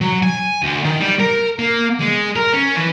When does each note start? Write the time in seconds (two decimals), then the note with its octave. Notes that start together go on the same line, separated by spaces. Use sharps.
0.01 F#3
0.23 G#5
0.63 D2
0.84 D#3
1.01 G3
1.20 A#4
1.59 A#3
2.00 G#3
2.36 A#4
2.54 C#4
2.76 E3